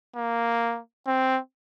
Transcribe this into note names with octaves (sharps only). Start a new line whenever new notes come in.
A#3
C4